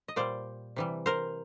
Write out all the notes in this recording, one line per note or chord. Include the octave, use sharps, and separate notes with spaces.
D#5
A#2 G3 C5 D5
C3 E3 G3
A#4 C5